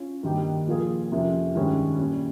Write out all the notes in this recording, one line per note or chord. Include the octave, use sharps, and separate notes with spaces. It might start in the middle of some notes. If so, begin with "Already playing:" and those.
Already playing: C#4 F4
G2 D#3 A#3 D#4 G4
A#2 F3 A#3 F4 G#4
F2 C3 F3 A#3 C#4
G2 D#3 G#3 C#4
A#2 G3 C#4